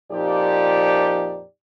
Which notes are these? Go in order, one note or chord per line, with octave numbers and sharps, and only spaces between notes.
F2 A#2 F3 D#4 G4 D5